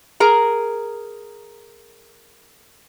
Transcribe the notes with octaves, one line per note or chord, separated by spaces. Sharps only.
G#4 A#4 A#5